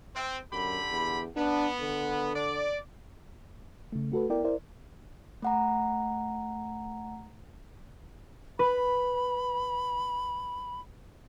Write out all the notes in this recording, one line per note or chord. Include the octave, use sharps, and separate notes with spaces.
C4
F#2 D3 G4 B5
E2
B3 D4
D3
D5
C#3 A3
A3 F#4 A4 B4
B3 E4 A#4 D5 G5
E4 A#4 C5 D5
A3 F#5 A#5
B4 B5